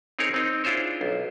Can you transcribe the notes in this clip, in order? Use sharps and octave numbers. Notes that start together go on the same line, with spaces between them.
C4 D#4 G#4 A#4 C#5
C4 D#4
D4 E4 F4 G#4 C5 C#5
B1